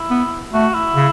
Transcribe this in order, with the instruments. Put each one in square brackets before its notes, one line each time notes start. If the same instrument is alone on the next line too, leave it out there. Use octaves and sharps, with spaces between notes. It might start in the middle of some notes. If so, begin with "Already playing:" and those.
Already playing: [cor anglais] E4
[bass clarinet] B3
[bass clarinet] A3 [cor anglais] F#4
[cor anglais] E4
[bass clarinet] C#3